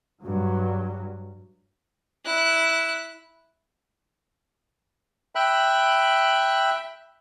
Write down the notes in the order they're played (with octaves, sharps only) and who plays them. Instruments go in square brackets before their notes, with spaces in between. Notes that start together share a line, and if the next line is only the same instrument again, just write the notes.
[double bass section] G2 F#3
[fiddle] E4 F#6
[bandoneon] E5 G5 B5 F#6